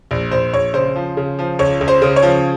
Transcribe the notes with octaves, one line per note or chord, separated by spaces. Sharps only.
A#1
A#1 C5
A#1 C#5
C#3 C5
F3
C#3
F3
C#2 C#5
C#2
C5
C#3
C#5
F3